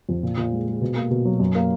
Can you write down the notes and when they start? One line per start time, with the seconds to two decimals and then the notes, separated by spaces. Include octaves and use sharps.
0.09 F2
0.23 A#2
0.37 A#2
0.52 G#3
0.67 G#3
0.81 B2
0.96 A#3
1.11 B2
1.25 F#3
1.40 F#2
1.55 A#3